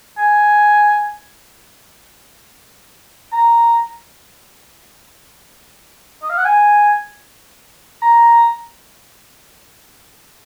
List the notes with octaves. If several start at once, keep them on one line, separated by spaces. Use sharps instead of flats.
G#5
A#5
D#5
F5
F#5
G#5
A#5